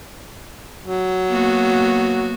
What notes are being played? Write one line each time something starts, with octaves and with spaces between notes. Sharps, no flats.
F#3
A#3 B3 F#4